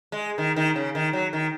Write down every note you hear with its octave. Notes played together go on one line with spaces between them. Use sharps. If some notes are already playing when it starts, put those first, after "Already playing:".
G#3
D#3
D#3
C#3
D#3
F#3
D#3